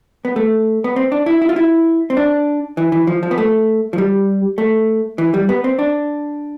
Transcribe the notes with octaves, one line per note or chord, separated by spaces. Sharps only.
B3
A3
B3
C4
D4
E4
E4
F4
E4
C4
D4
E3
E3
F3
F3
B3
A3
F3
G3
A3
E3
G3
B3
C4
D4